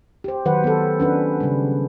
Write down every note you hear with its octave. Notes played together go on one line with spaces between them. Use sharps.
G4 C5
D#3 F#3 B4 C5 F#5
B3 A4
C#4 D4 B4
C#3 G3